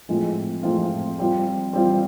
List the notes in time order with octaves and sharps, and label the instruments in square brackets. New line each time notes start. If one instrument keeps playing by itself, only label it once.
[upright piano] A2 F3 G#3 C4 F4
A2 F3 G#3 C4 F4
G3 C4 F4
G3 C4 F4